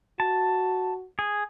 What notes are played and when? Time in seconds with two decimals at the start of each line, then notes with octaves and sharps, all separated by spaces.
0.20 F#4 A5
1.19 G#4